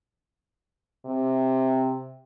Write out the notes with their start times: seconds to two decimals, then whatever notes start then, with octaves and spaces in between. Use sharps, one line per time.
1.05 C3